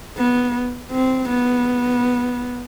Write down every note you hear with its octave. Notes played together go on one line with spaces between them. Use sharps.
B3
C4
B3